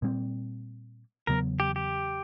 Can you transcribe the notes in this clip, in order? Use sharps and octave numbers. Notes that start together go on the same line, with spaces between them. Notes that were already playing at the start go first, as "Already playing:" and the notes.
A#2 G3 C4
E2 C#3 F#3 B3 A#4
G4
G4